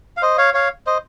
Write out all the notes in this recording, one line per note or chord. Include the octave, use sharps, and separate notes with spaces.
F5
C5 D#5
C#5 F5
C#5 F5
C5 D#5